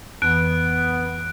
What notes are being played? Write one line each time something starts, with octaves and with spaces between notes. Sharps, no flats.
F2 E3 B3 F#6 D7